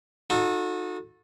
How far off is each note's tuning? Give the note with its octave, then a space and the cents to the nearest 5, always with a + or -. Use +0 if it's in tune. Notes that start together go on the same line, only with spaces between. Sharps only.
D#4 +0 F#4 -35 A4 +0